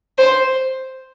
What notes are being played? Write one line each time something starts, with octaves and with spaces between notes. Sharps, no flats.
C5